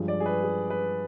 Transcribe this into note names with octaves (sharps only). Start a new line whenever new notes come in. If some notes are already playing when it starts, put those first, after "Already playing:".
Already playing: G2 F3 G#3
D5
G#4
B4
G#4
B4